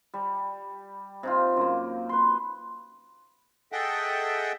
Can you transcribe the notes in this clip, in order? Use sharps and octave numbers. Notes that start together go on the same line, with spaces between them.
G3
C3 D#4 F4
F#2 A#3
B4 C6
G#4 A4 D#5 E5 F#5 G5